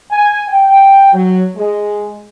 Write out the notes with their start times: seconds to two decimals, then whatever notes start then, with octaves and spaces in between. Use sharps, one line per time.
0.11 G#5
0.49 G5
1.12 F#3
1.55 G#3